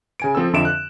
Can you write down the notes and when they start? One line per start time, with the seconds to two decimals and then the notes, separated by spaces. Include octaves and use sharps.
0.20 C#3 G#5 D7
0.35 F3 C4 A4 E6
0.53 F2 D3 F4 E5 D7 E7
0.65 F#6